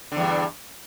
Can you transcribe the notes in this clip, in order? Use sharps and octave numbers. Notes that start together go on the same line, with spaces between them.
E2 G2 D3